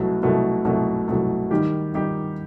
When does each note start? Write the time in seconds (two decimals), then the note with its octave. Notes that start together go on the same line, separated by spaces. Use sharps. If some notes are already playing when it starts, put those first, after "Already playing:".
Already playing: C2 B2 F#3 A3
0.23 C2 B2 F#3 A3
0.65 C2 B2 F#3 A3
1.08 C2 B2 F#3 A3
1.50 D#3 G3 D#4 G4
1.93 D#3 G3 D#4 G4